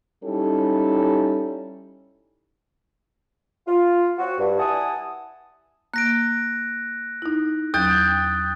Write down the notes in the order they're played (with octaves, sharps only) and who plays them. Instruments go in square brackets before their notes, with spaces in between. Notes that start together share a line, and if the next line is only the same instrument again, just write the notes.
[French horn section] G3 C#4 D#4 E4 G4 A4
[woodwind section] F4
C4 F#4
G2
E4 F#5 G#5 A5 D#6
[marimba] A#3 [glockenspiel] F#6 A#6 D7
[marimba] D#4 E4
[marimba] E2 F#3 C#4 [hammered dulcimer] G5 [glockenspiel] D#6 F#6 A6